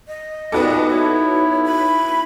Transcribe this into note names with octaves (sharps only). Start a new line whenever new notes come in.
D#5
A#2 G3 B3 D#4 F#4 A4 D6
E4 C#5
B5